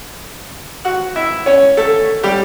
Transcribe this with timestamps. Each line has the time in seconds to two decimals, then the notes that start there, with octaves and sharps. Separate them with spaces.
0.85 F#4 F#5
1.16 E4 E5
1.46 C#4 C#5
1.77 A3 A4
2.23 G3 G4